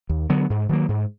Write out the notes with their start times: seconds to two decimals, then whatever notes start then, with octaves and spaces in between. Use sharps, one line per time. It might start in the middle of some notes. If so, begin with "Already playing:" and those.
0.09 D#2
0.29 D3 F#3 B3
0.50 G#2
0.69 D#3 F#3 A#3
0.89 G#2